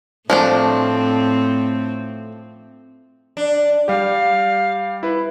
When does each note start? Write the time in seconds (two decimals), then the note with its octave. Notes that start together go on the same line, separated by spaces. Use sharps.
0.30 A2 F3 A3 C4 D4
3.37 D4
3.88 G3 G4 F5
5.03 E4 B4